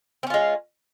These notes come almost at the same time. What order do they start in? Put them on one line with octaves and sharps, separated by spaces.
C4 C#4 F4 G#3